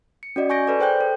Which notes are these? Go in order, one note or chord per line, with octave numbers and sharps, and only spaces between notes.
C#7
C#4 F#4 D5 D#5
G#5 C#6 G6 A#6 D7
A4 B4 D5
G#4 C5 G5 F#6 G6
A4